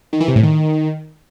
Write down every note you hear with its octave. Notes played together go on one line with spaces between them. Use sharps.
D#3
E3
C3
A2
D#3